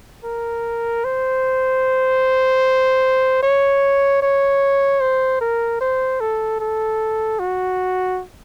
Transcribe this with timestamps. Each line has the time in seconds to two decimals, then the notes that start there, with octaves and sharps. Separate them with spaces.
0.25 A#4
1.05 C5
3.43 C#5
4.22 C#5
5.02 C5
5.41 A#4
5.81 C5
6.21 A4
6.61 A4
7.39 F#4